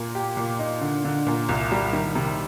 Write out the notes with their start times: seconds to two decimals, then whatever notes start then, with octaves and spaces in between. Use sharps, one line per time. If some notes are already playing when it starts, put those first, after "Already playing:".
Already playing: A#2
0.15 G4
0.37 A#2
0.59 D#4
0.81 D3
1.05 D3
1.27 A#2
1.49 C2
1.71 G3
1.93 D#3
2.15 C3